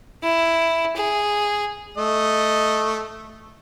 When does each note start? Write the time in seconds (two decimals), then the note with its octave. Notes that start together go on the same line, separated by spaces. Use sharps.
0.23 E4
0.96 G#4
1.97 A3 D#5